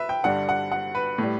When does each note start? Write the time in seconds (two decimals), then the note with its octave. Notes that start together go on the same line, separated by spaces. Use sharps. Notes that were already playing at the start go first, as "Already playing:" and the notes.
Already playing: B4 E5
0.09 G5
0.24 G2 D3 G3 F#5
0.49 F#5
0.72 F#5
0.95 B4
1.18 A2 G3